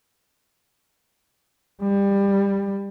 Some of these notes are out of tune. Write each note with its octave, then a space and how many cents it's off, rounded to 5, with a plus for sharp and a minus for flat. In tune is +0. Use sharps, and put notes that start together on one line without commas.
G3 +20